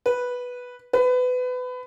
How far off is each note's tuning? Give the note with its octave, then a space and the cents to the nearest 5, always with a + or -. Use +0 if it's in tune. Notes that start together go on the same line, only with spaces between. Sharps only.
B4 -5
B4 +25